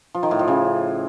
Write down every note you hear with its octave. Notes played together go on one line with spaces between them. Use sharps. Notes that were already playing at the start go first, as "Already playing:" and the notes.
F3
D#3
A2
F3
C#3